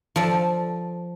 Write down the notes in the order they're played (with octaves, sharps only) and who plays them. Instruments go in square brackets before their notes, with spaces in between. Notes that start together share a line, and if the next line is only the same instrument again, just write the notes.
[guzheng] F3 A4 D5